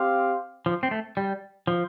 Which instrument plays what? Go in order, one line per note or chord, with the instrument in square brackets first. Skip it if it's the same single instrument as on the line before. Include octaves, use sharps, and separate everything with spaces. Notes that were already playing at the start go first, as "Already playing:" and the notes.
Already playing: [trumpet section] C4 G4 F5
[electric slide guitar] F3
C4
A3
G3
F3